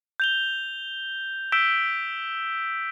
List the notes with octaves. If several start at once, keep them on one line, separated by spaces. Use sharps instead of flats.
G6 F7 G7
E6 G6 B6 D7 E7 G7